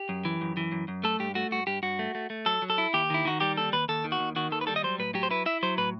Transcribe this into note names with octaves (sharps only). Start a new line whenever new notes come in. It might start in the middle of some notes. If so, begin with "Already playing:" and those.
Already playing: G4
F#2
E3
F#2
E3
F#2
F#2
A3 A4
G2 G4
A3 F#4
G2 F#4
G2 G4
G2 F#4
A3
A3
A3
F#3 A4
F#3
A4
E4
D#2 G4
D#3 E4
D#3 F#4
G3 G4
D#2 A4
D#2 B4
D#2 A4
D#3
F#4
D#2
D#3 F#4
D#2 A4
B4
G3 A4
D#5
F#3 C5
A2 B4
F#3 G4
C5
E4 B4
E4 E5
F#3 C5
A2 B4